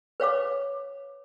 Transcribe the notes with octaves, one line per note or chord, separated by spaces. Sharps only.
B4 C#5 F5 D6